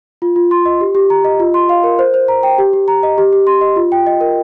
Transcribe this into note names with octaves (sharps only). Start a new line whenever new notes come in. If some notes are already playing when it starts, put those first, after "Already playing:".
F4
F4
C6
D#5
G4
G4
A#5
D#5
F4
C6
F5
A#4
C5
C5
A#5
G5
G4
G4
A#5
D#5
G4
G4
C6
D#5
F4
G5
D#5
A#4